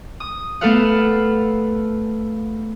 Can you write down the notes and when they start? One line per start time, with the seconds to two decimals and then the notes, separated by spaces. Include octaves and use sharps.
0.20 D#6
0.61 A3 B3 A4 B4 F5 F#5